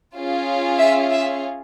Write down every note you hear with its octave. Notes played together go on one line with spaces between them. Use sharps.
C#4 F4 G#4
E5
E5